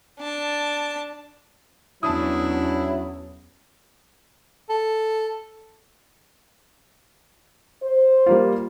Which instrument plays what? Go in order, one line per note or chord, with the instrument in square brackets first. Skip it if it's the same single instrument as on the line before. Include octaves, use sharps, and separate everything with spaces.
[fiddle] D4 A5
[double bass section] E2 C#4 [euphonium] F#3 [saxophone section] D4 E4 [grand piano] A5 D#6
[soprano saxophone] A4
[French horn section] C5
[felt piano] G3 A#3 F4